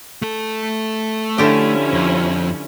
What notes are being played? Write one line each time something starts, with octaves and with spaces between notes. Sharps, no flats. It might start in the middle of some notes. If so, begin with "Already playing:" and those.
A3 A4
D3 F3 C#4 E4 G4
F2